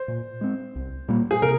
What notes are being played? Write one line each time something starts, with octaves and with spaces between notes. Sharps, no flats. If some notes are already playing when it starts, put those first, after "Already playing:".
Already playing: C5
A#2
G#3 C4
C2
A#2 G3 A#3
G#4
C3 A#4